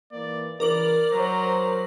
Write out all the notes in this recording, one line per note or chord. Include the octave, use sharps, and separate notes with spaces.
G#2 E3 A#3 D5
C#3 E3 A#4 D5 D6 F#7
F#3 C5 A#5